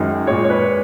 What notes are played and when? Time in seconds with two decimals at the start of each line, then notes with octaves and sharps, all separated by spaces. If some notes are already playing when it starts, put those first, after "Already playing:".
Already playing: F#2 D#3 G#3
0.27 A#2 G#3 C#5
0.44 C#5
0.50 B4